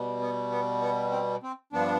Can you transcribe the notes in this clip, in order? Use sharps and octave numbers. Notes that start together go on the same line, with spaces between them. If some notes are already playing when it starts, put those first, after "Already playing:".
Already playing: B2 G3
B3
B3
B3
C4
C4
G2 F3 B3 D4